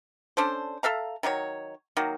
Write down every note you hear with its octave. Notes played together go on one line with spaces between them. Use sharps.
C#4 D4 A4 C5
A4 E5 F5 A#5
D#3 F#3 D#4 C#5
D#3 F#3 A#3